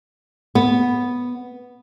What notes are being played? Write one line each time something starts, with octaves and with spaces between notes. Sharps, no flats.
B3